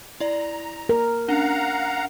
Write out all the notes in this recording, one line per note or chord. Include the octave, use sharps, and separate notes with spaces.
E4 D5 A#5
A#4
C#4 D4 F5 F#5 A#5